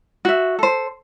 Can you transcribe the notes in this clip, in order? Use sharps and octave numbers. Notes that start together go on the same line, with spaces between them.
F#4 E5
A4 C5